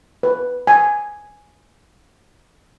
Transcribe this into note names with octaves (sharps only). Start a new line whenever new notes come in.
B4
G#5